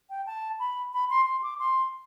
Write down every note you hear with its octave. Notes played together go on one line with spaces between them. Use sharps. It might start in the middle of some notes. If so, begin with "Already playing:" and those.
G5
A5
B5
B5
C6
C6
D6
C6